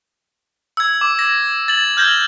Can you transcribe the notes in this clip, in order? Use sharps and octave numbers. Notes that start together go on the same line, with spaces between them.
E6 G#6
D6
A#6
A6 F#7
F6 G6 G#6 A#6 F#7